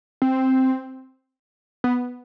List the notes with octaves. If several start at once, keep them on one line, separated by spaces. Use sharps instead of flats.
C4
B3